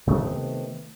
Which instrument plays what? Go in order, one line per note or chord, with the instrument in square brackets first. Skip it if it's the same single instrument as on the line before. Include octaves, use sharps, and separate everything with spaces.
[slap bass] C3 D#3 A3 B3